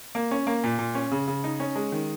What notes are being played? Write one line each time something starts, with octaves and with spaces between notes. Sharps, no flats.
A#3
C#4
A#3
A#2
A#2
C#4
C#3
C#3
D#4
C#4
G#3
D#3